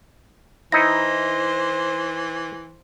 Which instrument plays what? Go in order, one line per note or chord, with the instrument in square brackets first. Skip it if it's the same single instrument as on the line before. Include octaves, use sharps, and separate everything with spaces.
[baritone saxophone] E3 [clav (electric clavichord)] D#4 E4 [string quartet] C5 [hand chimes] A#6